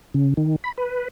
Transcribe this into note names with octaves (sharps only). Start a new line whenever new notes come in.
C#3
D#3
B5
B4